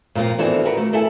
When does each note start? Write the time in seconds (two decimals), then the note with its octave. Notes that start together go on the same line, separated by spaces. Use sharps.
0.15 A#2 D3 F3 A#3 C4
0.38 D3 E3 B3 C4 F#4 G#5
0.65 F#4 A#4 B4
0.77 A3
0.93 E4 A4 E5 G#5